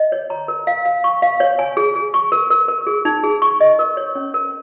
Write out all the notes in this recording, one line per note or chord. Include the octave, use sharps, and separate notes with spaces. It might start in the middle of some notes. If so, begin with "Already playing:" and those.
Already playing: D#5
C#5
A#5
A#4
F5
F5
C#6
F5
C#5
G#5
G#4
G#4
C#6
A#4
A#4
A#4
G#4
D#4
G#4
C#6
D#5
A#4
C#5
C#4
A#4